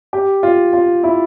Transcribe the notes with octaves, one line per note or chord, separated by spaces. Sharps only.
G4
F4
F4
E4